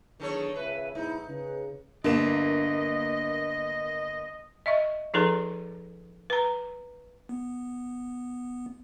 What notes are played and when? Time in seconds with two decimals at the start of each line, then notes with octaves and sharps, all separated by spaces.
0.20 B1 D#3 E3 D4 G#4 A4 C#5
0.56 C#2 C#3 B4 E5
0.95 B1 G#2 D#4 E4
1.28 C#3 B4
2.04 G1 A#3 D4 D#5 E7
4.66 D#5 E5 C#6
5.14 F3 D#4 G#4 A4 B4 A#5
6.30 B4 A#5
7.29 B3